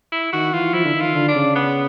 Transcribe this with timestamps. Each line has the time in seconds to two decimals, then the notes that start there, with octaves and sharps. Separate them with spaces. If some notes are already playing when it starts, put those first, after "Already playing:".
0.12 E4
0.33 D#3 F#4
0.53 E3 F4
0.74 F3 E4
0.85 D3
0.94 D#3
1.01 F4
1.14 D3
1.28 D4
1.35 C#3
1.56 B3